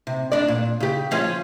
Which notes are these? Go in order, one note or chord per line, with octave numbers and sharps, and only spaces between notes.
C3
D4 D5
A#2
C#3 G4
F3 C#4 F4